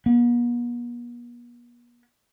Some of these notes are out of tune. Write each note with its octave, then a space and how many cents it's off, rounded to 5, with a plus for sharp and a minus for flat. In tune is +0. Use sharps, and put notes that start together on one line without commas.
B3 -45